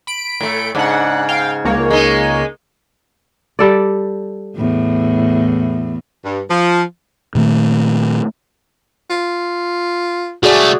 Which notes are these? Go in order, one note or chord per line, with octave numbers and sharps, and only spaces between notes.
B5 D7
A2 A3
G#2 C#3 D4 F#5
F5 G5
C#2 A#3 C#5
G#3 D#4
G3 A4 D5
E2 A2
G2
F3
A#2 D#3 A3
F4
C2 A3 F#4 G#4 D5